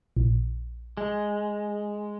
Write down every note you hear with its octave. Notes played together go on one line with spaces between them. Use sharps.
A#1
G#3